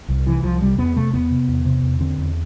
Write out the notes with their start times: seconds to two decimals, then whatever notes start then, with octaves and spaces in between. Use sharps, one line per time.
0.08 C2
0.26 C3 E3
0.43 C2 F3
0.61 C3 G3
0.78 E2 B3
0.96 C3 A3
1.13 E2 B3
1.30 C3
1.48 E2
1.65 C3
1.83 E2
2.01 D3 C4
2.18 E2